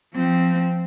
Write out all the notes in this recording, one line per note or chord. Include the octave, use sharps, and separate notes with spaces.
F3 C4